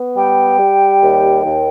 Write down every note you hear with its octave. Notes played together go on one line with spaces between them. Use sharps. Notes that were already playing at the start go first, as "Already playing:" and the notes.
Already playing: B3
G3 G5
G3
D#2
D#2